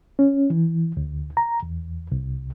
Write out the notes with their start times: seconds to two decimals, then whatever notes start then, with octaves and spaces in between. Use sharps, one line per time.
0.19 C#4
0.50 E3
0.97 D2
1.37 A#5
1.63 E2
2.12 C2